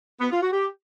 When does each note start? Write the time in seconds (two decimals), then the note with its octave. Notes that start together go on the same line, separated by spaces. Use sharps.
0.20 B3
0.31 F4
0.41 F#4
0.52 G4